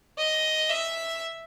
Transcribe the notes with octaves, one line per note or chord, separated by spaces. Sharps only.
D#5
E5